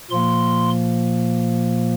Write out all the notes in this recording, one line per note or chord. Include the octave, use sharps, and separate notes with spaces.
A#2 F3 A#3 C6